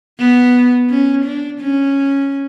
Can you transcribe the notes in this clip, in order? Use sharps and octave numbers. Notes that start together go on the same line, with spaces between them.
B3
C#4
D4
C#4